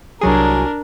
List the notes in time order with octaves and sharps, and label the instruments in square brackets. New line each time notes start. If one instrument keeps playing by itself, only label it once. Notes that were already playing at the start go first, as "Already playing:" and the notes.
[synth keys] C2 F#3 G#4 [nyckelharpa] D4 A#4